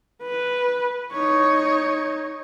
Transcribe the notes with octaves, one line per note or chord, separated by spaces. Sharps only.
B4
D#4 C#5